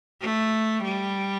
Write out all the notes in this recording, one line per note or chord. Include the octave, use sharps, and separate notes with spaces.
A3
G3